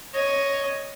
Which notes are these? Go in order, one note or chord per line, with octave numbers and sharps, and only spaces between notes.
C#5 D#5